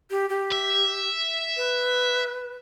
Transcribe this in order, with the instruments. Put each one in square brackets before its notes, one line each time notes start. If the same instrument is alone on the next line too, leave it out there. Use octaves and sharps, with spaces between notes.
[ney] G4
G4
[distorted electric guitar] E5
[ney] B4